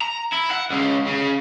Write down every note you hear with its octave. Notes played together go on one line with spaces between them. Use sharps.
A#5
E4
F#5
C#2 C#3
C#3